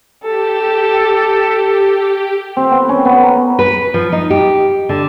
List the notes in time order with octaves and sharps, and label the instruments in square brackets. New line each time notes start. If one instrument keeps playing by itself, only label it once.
[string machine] G4 [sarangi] A4
[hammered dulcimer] C4
B3
C#4
B3
A#4
[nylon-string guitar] B4
F3
D#4
G4
D3